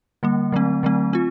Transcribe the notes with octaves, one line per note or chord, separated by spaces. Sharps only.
D3 G3 A#3
D3 F#3 A3 C4
D3 F#3 A3 C4
C4 F4